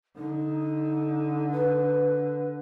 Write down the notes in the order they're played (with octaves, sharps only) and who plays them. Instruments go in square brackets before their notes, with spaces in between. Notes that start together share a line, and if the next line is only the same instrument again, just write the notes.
[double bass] D3 [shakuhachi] D#4
[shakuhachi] B4